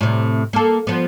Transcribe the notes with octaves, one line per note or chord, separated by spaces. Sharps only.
A2 C3
A#3 A4
F3 B3